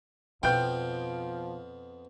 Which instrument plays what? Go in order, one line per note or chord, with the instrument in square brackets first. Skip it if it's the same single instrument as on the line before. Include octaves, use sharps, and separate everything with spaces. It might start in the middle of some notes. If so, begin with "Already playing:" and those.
[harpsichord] F2 B3 F5 [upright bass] B2 [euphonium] F3 [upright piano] G5 G6